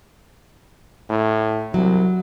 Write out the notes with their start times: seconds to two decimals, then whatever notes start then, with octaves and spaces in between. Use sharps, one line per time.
1.10 A2
1.74 C2 F#3